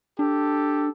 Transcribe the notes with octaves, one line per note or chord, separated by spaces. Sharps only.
D4 G4 A4